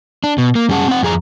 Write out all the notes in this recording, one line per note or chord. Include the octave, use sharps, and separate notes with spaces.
D4
B2
A#3
F#2 G3 C#4 G#4 F#5 A5
C4 F#5
F2 G#4 A#5